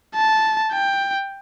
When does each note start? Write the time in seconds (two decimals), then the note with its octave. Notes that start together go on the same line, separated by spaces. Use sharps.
0.15 A5
0.72 G5